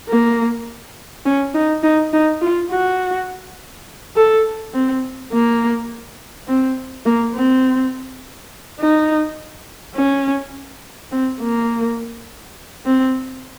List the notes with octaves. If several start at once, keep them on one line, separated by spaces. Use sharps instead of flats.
A#3
C#4
D#4
D#4
D#4
F4
F#4
A4
C4
A#3
C4
A#3
C4
D#4
C#4
C4
A#3
C4